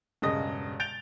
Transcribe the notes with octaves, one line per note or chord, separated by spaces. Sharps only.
E1 G2 C#3 D#5 D#6 A#6
G6 A6 D7 F7 G7